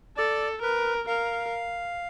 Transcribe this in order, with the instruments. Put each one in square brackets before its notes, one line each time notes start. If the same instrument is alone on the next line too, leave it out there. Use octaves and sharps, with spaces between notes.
[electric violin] A4 [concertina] D5
[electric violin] A#4 [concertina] B4
[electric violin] A#4 [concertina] F5